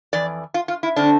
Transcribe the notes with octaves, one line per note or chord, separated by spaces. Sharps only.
F2 E3 D5
F4
F4
E4
D3 A3 C4 D4